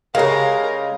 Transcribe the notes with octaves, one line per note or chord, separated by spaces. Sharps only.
C#3 G#3 G4 A#4 C#5 D#5 F5